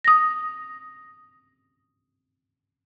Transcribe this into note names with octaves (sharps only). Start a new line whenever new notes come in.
D#6 A#6